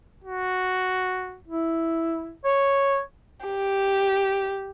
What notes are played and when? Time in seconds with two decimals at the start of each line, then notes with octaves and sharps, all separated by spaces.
0.24 F#4
1.48 E4
2.44 C#5
3.47 G4